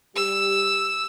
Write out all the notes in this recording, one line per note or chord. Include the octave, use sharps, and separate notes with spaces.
G3 G4 E6